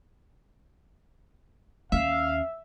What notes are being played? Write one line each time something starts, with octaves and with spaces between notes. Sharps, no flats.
D#2 C#4 E5 F5